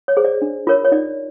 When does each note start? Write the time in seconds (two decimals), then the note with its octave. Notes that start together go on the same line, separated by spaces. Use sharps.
0.08 C#5
0.17 G#4 C5
0.25 D5
0.42 D4
0.67 F4 A#4 C#5
0.85 C#5
0.92 D#4 D5